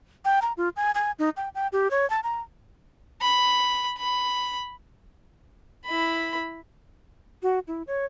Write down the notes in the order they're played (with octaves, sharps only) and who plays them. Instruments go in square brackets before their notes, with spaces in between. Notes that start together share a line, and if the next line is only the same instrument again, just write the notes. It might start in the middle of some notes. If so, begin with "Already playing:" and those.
[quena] G5
A#5
F4
G#5
G#5
D#4
G5
G5
G4
C#5
A5
A#5
[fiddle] B5
B5
E4 B5
[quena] F#4
E4
C#5